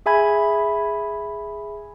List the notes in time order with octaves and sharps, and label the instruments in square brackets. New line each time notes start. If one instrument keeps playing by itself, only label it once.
[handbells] G#4 E5 G#5 B5 G#6